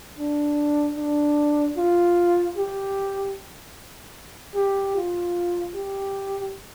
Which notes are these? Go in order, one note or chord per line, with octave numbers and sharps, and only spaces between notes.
D4
D4
F4
G4
G4
F4
G4